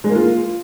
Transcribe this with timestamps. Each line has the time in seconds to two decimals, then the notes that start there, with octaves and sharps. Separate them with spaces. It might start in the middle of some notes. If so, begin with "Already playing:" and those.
0.04 G#3
0.10 A#3
0.15 F4